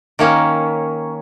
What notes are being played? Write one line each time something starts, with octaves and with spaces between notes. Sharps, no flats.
D#3 A#3 C#4